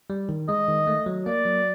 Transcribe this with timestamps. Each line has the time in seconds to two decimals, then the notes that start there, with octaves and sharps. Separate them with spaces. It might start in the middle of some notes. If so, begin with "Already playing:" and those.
0.10 G3
0.29 D#3
0.48 G#3 D#5
0.68 D#3
0.87 A3
1.06 F#3
1.26 A#3 D5
1.45 F#3